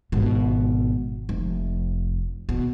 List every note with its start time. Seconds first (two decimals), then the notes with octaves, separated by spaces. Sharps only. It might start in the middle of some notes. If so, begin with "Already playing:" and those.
0.12 G#1 B2
1.29 F1
2.49 B2